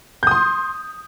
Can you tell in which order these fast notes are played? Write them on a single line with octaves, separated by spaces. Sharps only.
G6 D#6 C6